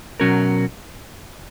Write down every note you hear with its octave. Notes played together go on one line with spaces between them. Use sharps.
B2 F#3 C#4 F#4 A#4